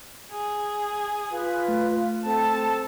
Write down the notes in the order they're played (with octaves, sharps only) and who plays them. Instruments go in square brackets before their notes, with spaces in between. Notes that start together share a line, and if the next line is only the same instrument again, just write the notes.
[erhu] G#4
[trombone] F4 [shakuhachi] B4
[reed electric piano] A3
[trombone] C4 [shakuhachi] A4 [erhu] A5